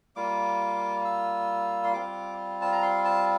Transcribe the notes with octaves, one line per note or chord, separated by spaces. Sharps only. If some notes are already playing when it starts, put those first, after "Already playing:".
G3 A#3 F4 D6
E6
C6
G3 C4 F4 D6
A5
A#5
C6
A5